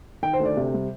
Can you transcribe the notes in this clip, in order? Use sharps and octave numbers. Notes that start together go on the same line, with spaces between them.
D#3 G5
C5
D2
D5
C3
G3